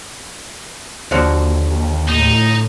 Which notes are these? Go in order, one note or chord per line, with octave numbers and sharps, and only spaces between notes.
D#2 D3 F3 F#4
A2 D#4